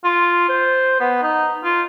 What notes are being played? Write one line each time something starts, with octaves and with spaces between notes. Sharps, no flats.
F4
C5
B3
D#4
F4